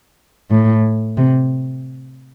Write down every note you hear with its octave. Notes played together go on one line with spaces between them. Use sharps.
A2
C3